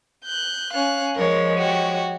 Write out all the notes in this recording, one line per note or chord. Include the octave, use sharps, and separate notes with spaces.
F#6 G6
C#4 F5 F#6
F3 G#3 A#4 C#5
F#4 G4